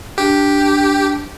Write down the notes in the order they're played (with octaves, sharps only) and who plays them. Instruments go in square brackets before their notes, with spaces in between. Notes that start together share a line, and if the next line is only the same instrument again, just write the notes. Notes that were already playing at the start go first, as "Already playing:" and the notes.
[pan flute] D4 [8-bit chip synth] G4